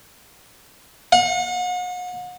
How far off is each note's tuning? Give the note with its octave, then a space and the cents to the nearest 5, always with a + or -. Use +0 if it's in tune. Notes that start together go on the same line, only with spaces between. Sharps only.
F#5 -40